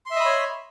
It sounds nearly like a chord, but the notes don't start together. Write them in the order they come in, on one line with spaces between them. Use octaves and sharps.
C6 E5 D#5 B5 C#5